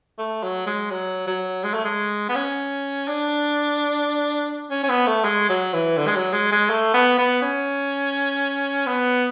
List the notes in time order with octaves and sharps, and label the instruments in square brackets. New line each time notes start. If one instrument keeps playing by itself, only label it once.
[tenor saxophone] A3
F#3
G#3
F#3
F#3
G#3
A3
G#3
B3
C#4
D4
C#4
C#4
B3
A3
G#3
F#3
E3
D3
G#3
F#3
G#3
G#3
A3
B3
B3
C#4
B3